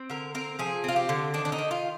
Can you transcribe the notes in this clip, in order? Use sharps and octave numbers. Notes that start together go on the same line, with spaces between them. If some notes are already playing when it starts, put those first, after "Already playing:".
Already playing: C4
D3 A#4
C4 A#4
F3 G#4
C4 F4
G4
D3
D#3 D4
D4
D#4
D#3
F4